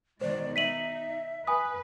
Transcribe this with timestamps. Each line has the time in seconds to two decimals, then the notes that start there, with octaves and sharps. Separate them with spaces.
0.21 B2 D#3 G#3 C5 D5
0.56 D#4 E5 B6 D#7 F#7
1.47 B4 G#5 D#6